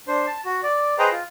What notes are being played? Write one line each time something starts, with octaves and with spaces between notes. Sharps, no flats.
D4 C5
A5
F#4
D5
G#4 B4 C5 D#5 G5 A#5
F4